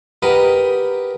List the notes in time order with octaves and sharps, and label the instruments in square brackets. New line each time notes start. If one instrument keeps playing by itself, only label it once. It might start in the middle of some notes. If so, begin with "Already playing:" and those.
[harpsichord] G4 A#4 B4 D#5 F#5 G5